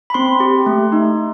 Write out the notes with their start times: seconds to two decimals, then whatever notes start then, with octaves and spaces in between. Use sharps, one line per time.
0.10 B5
0.14 C4 C6
0.40 G4
0.66 A3
0.92 D#4